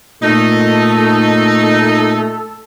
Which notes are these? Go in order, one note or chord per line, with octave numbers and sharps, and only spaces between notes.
A#2 A3 D#4 A4